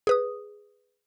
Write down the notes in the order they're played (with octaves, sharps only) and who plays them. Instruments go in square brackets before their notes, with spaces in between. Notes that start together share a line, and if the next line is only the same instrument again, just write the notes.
[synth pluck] G#4 B4 D#6